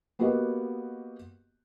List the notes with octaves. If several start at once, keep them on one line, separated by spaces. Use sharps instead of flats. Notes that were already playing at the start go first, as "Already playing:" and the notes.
A#3 B3 F#4 G4 B4 D#5